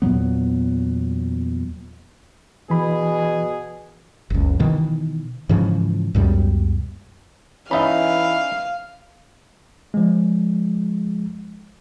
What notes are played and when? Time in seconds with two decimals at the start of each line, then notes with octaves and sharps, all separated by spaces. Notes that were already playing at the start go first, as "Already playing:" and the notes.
0.02 E2 A#2 F#3 B3
2.70 B2 E3 G#4 B5
4.30 F#1 C#2
4.59 B2 D#3 E3
5.49 G#2 C#3 E3 F3
6.15 C#2 F#2 B2 G3
7.71 E3 C#4 D#4 E5 F5 B5
9.94 F3 G#3